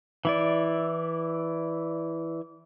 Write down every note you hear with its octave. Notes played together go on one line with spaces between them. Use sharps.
E3 E4 D5